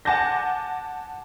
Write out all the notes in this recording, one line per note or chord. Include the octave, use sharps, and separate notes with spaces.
F#5 G#5 A5 D6 G6 A#6